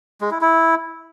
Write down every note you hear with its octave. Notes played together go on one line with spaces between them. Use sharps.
G#3
E4
E4